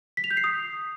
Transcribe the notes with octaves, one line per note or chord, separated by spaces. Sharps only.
B6
F7
G6
C7
D#6